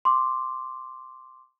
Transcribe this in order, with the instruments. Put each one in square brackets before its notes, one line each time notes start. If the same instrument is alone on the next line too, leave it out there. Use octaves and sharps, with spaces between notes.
[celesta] C6 D6